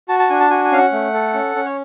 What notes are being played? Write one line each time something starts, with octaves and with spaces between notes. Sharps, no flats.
F#4 A5
A5
D4 G#5
A5
F#4 G#5
G#5
C#4 F5
F#5
A3
A4
C#4
C#4
C#5